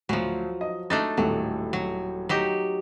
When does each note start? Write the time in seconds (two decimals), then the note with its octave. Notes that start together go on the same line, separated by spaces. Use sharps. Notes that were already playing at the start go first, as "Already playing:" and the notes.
0.09 D2 F3 F#3
0.61 D#5
0.90 A3 D4 D#4 A6
1.17 D#1 A2 F#3 A4
1.73 F#3
2.29 F#3 D#4 G4